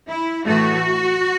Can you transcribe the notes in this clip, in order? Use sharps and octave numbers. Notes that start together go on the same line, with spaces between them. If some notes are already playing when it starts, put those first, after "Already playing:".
E4
A2 E3 A3 F#4